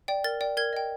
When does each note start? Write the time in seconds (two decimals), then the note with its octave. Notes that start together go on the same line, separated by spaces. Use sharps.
0.08 D5 G5
0.24 A#4 A6
0.41 D5 G5
0.57 A#4 G#6
0.73 D#5 G5